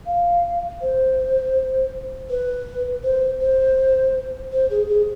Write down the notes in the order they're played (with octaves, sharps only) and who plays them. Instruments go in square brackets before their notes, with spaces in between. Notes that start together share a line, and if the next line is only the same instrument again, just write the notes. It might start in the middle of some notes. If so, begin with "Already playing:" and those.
[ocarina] F5
C5
B4
C5
C5
C5
G#4
G#4